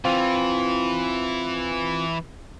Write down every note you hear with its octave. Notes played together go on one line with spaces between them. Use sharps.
E3 C4 F4